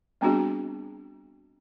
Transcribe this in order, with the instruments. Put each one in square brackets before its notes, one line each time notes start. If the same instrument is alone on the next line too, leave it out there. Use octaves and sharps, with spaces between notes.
[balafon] G3 B3 C4 D4 F#4 G#4